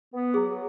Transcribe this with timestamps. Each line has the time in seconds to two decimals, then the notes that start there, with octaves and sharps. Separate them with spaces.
0.13 B3
0.34 F#3 G#4